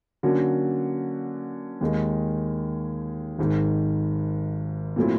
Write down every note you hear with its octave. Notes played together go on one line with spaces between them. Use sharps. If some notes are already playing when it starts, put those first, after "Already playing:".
D3 F#3 A#3 C#4 F#4
D#2 D#3 G#3
G#1 G#2 D#3
A#2 F#3 A3 C4 E4